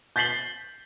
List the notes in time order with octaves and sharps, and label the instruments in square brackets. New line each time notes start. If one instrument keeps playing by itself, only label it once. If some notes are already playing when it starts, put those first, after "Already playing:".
[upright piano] G6 A6 B6 C7 F#7 G7